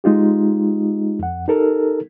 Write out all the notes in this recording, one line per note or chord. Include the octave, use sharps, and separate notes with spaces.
G#3 D#4 F4 G4
F2 F#5
D#4 G4 A4 A#4